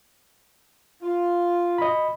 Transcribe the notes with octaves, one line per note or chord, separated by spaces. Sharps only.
F4
D#5 B5